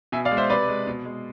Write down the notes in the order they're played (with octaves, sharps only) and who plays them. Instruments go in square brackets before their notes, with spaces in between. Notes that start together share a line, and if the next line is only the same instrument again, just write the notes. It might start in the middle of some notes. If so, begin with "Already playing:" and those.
[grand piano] B2 E5 G#5
D5 F5
G#3
C5 E5
C3 B4 D5
G#3
B2
G#3